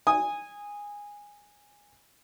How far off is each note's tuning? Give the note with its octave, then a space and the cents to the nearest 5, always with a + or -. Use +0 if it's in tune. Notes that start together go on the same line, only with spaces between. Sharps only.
G#5 -15 D#6 +0